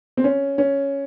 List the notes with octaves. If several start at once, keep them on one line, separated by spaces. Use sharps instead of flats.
C4
C#4
C#4